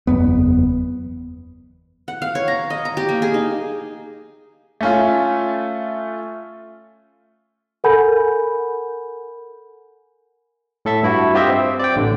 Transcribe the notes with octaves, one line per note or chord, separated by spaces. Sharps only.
F#1 E2 B3
F#5
F5
C#5
A#5
D#5
A#5
G4
A#3
G#4
D#4
A3 C#4 F4
A4 A#4 F#5 G#5 B5 G6
A2 A4 E5
G2 E4 F#4
C4 F4 G4 C5 D#5 E5
C4
D5 G5
A1 D3